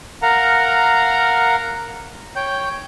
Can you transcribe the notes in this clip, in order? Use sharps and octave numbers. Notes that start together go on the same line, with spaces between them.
A#4 F5 F#5 A#5
C#5 G5 G6